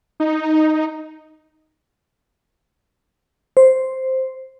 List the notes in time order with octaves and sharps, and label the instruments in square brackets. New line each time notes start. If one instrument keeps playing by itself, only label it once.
[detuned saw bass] D#4
[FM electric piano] C5